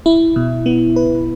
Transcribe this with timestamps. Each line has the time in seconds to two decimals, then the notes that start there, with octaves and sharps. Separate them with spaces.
0.06 E4
0.36 B2
0.66 B3
0.96 B4